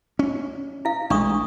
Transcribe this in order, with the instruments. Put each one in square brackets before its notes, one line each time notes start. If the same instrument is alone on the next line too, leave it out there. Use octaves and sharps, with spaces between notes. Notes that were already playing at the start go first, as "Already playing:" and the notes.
[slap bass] C#4
[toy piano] E4 F5
[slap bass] A1 G#3 [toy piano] D4 C#6 D#6